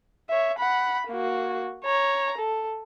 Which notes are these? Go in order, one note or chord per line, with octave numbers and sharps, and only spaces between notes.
C#5 E5
F#5 B5
A#3 F#4
C#5 A#5
A4